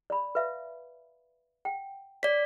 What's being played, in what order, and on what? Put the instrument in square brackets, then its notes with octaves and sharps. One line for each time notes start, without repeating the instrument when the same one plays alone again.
[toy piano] D5 B5
B4 E5 F5
F#5 G5
[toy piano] C#5 [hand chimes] D5 B6